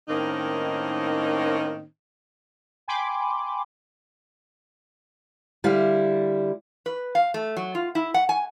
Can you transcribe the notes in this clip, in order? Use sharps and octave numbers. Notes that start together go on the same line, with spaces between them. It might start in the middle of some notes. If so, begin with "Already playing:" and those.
A2 D#3 A#3 C4 C#4 D#4
G5 G#5 B5 C6 D6
D3 G3 E4 F5
B4
F5
A3
F#3
F4
E4
F#5
G#5